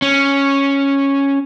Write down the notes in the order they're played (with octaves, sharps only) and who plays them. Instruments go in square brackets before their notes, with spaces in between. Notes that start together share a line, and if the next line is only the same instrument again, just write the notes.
[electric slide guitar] C#4